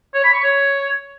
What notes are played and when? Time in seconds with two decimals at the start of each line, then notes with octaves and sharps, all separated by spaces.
0.14 C#5
0.24 B5
0.34 C#6
0.43 C#5